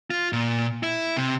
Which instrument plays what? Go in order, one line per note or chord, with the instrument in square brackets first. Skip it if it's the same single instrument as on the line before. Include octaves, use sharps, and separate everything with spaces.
[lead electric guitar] F4
A#2
E4
C3